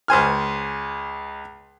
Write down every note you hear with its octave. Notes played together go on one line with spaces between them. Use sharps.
C#2 C5 G#5 F6